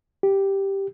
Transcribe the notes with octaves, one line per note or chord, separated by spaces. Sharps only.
G4